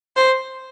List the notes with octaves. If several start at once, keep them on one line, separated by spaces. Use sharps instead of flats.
C5